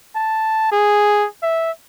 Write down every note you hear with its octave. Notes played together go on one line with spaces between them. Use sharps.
A5
G#4
E5